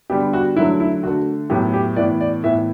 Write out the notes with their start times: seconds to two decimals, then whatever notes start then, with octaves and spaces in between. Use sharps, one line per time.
0.10 D3 G3 B3 G4
0.33 F#4
0.56 D3 F#3 A3 E4
0.80 E4
1.03 D3 A3 F#4
1.50 A2 F#3 B3 G4
1.73 G4
1.96 A2 E3 B3 D5
2.20 D5
2.43 A2 E3 B3 E5